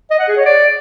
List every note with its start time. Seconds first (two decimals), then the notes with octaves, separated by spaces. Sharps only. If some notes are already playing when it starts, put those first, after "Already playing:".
0.11 D#5
0.19 F#5
0.28 G#4
0.37 C#5
0.46 D5